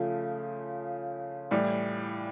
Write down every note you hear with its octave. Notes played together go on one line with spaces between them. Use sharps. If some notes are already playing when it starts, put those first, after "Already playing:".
Already playing: C#3 F3 A3
A2 E3 G3